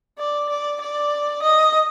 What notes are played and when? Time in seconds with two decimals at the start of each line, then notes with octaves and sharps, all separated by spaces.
0.18 D5
0.49 D5
0.81 D5
1.42 D#5